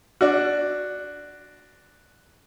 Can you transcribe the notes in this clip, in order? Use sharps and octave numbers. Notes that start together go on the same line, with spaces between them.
D4 F#4